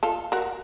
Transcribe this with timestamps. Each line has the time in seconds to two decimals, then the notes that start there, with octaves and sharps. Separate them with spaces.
0.03 F4 A4
0.32 F#4 A#4